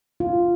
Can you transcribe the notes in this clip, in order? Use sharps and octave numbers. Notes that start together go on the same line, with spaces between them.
F4